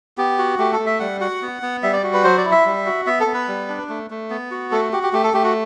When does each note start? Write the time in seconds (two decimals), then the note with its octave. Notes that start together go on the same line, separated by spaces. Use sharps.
0.18 B3 G4
0.38 F#4
0.58 A3 G4
0.73 A4
0.79 A3
0.86 E5
1.00 G3 F#5
1.21 F#4 F#5
1.42 B3
1.62 B3
1.83 G3 E5
1.93 D5
2.03 F#4
2.13 B4
2.24 F#3 C5
2.38 D5
2.45 E4
2.52 E5
2.66 G3
2.86 F#4
3.06 B3 E5
3.20 A4
3.27 B3
3.34 B4
3.48 G3
3.68 D4
3.89 A3
4.10 A3
4.30 B3
4.51 F#4
4.72 A3 A4
4.92 F#4 G4
5.03 G4
5.13 A3 G4
5.24 A4
5.34 A3 G4
5.44 F#4